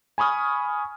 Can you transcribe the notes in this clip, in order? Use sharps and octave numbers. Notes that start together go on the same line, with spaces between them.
G#5 B5 C#6 D#6 F6